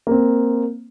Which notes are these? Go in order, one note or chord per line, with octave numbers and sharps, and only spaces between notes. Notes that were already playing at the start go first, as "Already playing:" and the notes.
A#3 C4